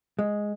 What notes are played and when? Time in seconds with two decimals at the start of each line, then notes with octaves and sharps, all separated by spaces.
0.19 G#3